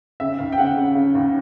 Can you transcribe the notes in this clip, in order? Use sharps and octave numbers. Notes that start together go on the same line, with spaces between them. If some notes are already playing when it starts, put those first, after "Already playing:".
C#3 E5
D#2 F5
G5
C#3 F#5
C#3
C#3
D#2